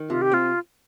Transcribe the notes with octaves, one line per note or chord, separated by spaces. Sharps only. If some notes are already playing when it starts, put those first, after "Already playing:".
Already playing: D#3
C3 F4
G4
C4 F4